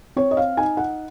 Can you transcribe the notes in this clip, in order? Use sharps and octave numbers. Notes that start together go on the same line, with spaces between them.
C4 C#5
D#5
F5
D#4 G#5
F#5